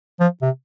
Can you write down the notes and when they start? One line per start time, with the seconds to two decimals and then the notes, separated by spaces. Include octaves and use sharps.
0.20 F3
0.42 C3